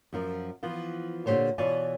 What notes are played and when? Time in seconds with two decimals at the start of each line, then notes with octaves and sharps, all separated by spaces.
0.13 F#2 F3 A#4
0.63 E3 F3 B3 F4
1.26 A#2 D3 D#3 G4 C5 C#5
1.58 B2 E3 F4 C#5 D5 G#5